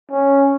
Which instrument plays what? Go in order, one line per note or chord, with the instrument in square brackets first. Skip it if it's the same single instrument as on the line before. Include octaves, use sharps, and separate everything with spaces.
[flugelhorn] C#4